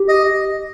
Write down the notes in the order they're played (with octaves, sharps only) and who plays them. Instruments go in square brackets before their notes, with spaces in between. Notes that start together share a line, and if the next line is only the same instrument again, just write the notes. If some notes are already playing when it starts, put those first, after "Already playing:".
Already playing: [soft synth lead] G4
[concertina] D#5